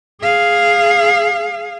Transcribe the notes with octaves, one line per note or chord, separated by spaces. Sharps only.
G#4 F5